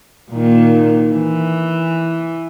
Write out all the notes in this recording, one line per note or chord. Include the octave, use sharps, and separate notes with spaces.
A#2 D#3
E3